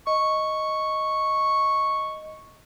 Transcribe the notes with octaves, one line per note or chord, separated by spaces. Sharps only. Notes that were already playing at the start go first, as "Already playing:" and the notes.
D#5 C#6